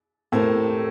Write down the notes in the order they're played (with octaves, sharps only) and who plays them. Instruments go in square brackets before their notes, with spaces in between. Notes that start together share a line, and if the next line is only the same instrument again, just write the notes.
[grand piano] A2 [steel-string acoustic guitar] A3 C4 G4 A#4